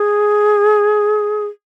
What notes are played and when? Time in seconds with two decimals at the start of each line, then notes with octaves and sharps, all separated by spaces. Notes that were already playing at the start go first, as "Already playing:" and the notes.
Already playing: G#4